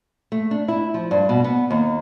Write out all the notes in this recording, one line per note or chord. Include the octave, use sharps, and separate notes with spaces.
A3
D4
E4
F3
G2
B2
B3
D#2